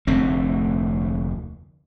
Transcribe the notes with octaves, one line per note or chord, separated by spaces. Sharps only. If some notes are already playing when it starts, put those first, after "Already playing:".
F1 D2 A3 C4